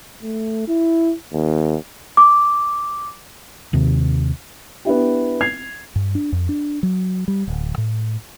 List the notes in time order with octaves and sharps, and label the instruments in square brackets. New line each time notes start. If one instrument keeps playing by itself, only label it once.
[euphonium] A3
E4
D#2
[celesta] D6
[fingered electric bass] D#2 C3
[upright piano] B3 D4 E4 G4
G#6 C7 F7
[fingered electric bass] G2
D4
F2
D4
F#3
G3
D1
A2